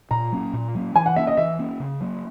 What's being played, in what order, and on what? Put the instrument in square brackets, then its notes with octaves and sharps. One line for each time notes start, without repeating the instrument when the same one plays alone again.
[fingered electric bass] A#2 [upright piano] A#5
[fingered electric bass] F#3 A#3 C#4
A#2
F#3 A#3 C#4
[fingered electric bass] E3 [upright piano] G#5
[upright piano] F#5
[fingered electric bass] A#3 C#4 [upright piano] E5
[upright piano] D#5
[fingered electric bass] E3 [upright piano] E5
[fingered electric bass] A#3 C#4
C#3
F#3 A#3